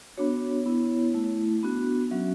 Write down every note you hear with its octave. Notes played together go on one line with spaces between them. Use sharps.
B3 D4 F#4 C#5
B3 E4
A3 E4
B3 D4 F#4
F#3 C#4 F#4 E5